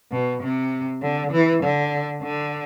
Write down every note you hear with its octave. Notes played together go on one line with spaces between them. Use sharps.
B2
C3
D3
E3
D3
D3